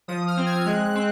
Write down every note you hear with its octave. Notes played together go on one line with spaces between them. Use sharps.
F3 D#6
F6
C4
G#6
G#3 F#6
F#6
C4